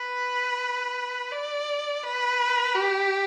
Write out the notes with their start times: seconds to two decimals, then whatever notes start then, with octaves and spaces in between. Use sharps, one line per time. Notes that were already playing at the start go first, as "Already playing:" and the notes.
Already playing: B4
1.31 D5
2.03 B4
2.75 G4